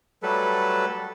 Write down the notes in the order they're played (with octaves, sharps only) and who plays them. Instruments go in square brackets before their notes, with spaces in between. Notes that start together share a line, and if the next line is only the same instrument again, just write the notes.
[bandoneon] F#3 G3 A3 A4 B4